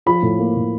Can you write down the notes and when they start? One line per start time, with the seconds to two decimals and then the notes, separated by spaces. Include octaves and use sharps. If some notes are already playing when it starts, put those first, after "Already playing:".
0.06 F3 B5
0.22 A2
0.39 A#3
0.55 A2